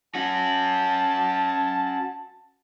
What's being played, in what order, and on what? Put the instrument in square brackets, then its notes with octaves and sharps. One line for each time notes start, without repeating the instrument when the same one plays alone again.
[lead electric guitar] C#4 F#4 [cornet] A5